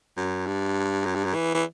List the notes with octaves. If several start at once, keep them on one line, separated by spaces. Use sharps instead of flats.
F#2
G2
F#2
G2
F#2
E3
E3